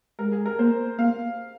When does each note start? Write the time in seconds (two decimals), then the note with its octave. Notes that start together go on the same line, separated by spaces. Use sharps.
0.19 G#3 A#4
0.32 G#4
0.46 A#4
0.59 A#3 C5
0.98 A#3 F5